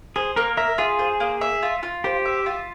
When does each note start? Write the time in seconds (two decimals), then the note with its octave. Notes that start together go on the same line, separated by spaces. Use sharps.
0.16 G#4 C5
0.36 A#3 A#4
0.57 A#4 E5
0.78 F4 G#4
0.99 C5
1.20 A#3
1.41 E5
1.63 F4
1.83 F4
2.04 G4 C5
2.25 E5
2.46 F4